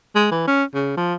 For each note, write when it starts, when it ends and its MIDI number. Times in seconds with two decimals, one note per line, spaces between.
0.15 0.27 56
0.31 0.47 52
0.47 0.64 61
0.74 0.96 49
0.97 1.15 53